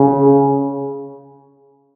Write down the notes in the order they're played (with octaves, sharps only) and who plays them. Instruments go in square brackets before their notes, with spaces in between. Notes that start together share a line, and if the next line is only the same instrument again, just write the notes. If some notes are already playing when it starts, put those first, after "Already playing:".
Already playing: [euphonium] C#3